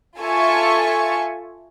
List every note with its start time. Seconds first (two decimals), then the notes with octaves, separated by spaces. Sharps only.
0.19 F4 A4 E5 G#5 C#6